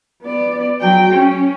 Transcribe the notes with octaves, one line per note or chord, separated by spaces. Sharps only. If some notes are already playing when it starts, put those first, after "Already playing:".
B3 D5
F#3 G5
C#4